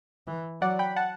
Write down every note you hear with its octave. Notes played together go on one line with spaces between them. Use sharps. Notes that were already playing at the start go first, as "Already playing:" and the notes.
E3
F#3 D5 F#5
G5 B5
F#5 A5